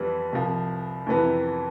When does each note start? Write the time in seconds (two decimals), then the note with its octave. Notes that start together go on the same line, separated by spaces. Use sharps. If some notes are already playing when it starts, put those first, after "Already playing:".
Already playing: F2 E3 G3 B3
0.33 C2 C3 F3
1.07 F2 C3 E3 B3 E4